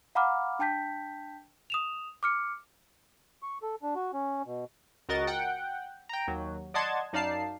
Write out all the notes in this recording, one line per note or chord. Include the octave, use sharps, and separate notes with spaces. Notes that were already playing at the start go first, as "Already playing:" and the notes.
F5 F#5 A#5 B5 D6 F6
D4 G5 A5 G6 B6
D#6 E7 F7
D6 F6 C#7
C#6
A4
D4
F#4
C#4
B2
C#2 F#4 A#4 D#5 A6
F#5 G5
G5 A#5
D#2 F#3
D5 D#5 F#5 A5 C6 G#6
F#2 D#4 D5 F5 A5 C7